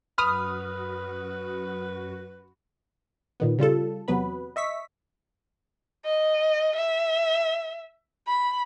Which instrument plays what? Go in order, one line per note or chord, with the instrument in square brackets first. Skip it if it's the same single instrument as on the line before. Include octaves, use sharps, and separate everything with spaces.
[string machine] F#2 F#4 [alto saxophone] B4 [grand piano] B5 [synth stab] D#6 F6
[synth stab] A#2 D#3 B3
C#3 G3 F4 A4
E2 C3 F#3 B3 B4 B5
D#5 E5 C#6 B6
[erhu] D#5
E5
B5